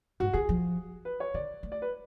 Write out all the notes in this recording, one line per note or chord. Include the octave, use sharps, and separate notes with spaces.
G#2 F#4
D3 G#4
F3
B4
C#5
D3 D5
A3
D5
B4